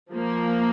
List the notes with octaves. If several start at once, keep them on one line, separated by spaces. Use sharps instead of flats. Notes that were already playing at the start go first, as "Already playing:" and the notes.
F3 A#3